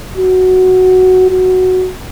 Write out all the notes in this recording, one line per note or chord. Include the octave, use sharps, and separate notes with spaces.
F#4
F#4